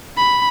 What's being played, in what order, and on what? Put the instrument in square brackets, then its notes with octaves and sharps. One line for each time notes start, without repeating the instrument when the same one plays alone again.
[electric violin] B5